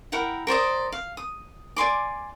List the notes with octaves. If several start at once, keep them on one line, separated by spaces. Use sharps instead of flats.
E4 A#4 F#5 G5
A#4 C5 D5 D#5
F5
D#6
D5 G#5 C6 D6